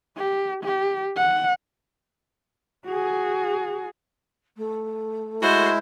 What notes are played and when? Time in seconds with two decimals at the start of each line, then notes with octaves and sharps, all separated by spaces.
0.17 G4
0.64 G4
1.16 F#5
2.86 F#4 G#4
4.57 A3
5.42 G#3 E4 F#4 C5